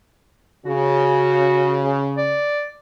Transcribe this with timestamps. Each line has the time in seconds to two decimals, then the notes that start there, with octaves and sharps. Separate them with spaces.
0.65 C#3 F#4
2.17 D5